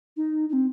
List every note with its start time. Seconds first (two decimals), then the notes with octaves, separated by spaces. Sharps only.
0.17 D#4
0.49 D#4
0.53 C4